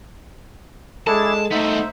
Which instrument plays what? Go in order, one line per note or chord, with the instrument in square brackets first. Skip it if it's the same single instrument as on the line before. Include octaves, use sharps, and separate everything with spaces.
[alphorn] G#3 [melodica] D4 E4 G#4 [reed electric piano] A4 [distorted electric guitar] A5
[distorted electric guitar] A3 B3 [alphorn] D#4 [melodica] C5 E5